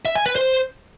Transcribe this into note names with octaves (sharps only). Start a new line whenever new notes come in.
E5
G#5
B4
C5